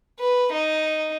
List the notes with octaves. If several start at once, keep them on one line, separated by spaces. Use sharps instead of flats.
B4
D#4